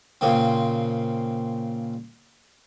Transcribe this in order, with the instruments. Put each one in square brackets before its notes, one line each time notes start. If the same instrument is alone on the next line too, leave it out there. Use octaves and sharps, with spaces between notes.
[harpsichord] A#2 C#3 A#3 C4